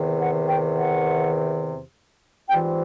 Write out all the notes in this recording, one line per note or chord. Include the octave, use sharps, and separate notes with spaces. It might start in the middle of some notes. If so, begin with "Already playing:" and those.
Already playing: E2 C3 D#3
F#5
G5
F#5
G#2 E3 G3 C4 F4 G5